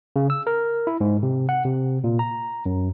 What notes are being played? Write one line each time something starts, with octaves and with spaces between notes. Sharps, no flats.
C#3
E6
A#4
E4
G#2
C3
F#5
C3
A#2
A#5
F#2